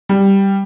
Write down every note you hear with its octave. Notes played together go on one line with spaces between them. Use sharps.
G3